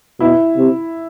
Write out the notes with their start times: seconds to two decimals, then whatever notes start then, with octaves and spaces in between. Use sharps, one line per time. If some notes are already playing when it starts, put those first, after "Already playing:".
0.20 B2 E4
0.56 C3